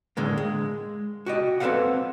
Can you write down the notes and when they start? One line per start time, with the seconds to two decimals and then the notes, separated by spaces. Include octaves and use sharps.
0.17 A2 D3 G#3 A#3
0.38 G#3
1.26 F#4 G4 D#5
1.60 C4 A4 B4 C5 F5 F#5